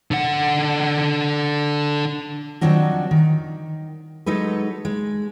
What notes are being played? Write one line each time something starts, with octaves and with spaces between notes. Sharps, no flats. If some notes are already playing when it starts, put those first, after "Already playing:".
D3 F#5
D#3 F3 F#3 C4 D4 F#4
D#3
F#3 G#3 D#4 A4 B4
G#3